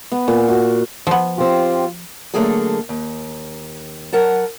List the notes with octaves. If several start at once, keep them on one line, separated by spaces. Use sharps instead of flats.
B3
A#2
F#4
F3 B3
C4 F4 G4
D3 F#3 A3 A#3 G#4 A4
D#2
F#3 A#4 F#5 A5